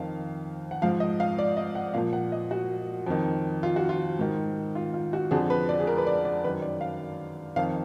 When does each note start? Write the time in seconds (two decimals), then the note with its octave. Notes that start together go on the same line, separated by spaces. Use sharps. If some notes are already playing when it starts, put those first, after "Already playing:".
Already playing: F2 D#3 F5
0.71 F#5
0.82 G#2 F3 F5
1.00 D#5
1.20 F5
1.39 D5
1.57 D#5
1.75 F#5
1.94 A#2 F3 F5
2.13 F#5
2.32 D#5
2.51 F#4
3.06 F2 D#3
3.63 F4
3.76 F#4
3.89 F4
4.19 G#2 D#3
4.75 F4
4.94 F4
5.13 F#4
5.31 F2 D3 F3 G#4
5.50 B4
5.69 D5
5.80 G#4
5.87 A#4
5.98 B4
6.07 D5
6.25 D5
6.44 D#3 B4
6.48 F#2
6.62 D5
6.81 F5
7.56 F2 D#3 F5